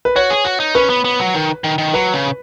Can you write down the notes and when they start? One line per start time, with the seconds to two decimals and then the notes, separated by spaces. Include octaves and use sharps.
0.05 B4
0.16 F#4 C#5
0.30 G#4
0.45 F#4
0.60 D#4
0.75 C#4 B4
0.90 B3
1.04 B3
1.19 F#3
1.35 D#3
1.64 D#3
1.78 D#3
1.94 F#3 B4
2.13 C#3